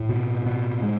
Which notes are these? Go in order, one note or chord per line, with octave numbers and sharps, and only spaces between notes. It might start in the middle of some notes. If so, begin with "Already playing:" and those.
Already playing: A2
B2 B3
B2 B3
G#3